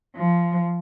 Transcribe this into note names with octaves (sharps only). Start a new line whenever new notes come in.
F3